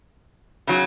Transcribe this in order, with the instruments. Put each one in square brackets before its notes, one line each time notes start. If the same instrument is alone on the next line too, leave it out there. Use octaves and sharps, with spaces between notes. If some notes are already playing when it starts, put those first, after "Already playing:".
[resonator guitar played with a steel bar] C#3 F#3